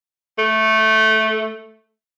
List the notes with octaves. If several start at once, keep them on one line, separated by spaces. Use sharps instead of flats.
A3